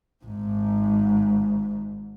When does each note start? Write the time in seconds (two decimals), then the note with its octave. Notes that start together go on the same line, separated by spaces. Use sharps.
0.25 G#1 G#2